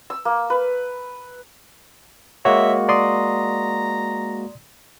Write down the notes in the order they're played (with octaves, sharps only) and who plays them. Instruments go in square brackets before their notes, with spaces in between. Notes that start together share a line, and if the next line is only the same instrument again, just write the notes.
[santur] E6
A#3
B4
[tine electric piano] G#3 A#3 F#4 [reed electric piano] C#5 [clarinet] E5
[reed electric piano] D5 C6 D#6 [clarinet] A#5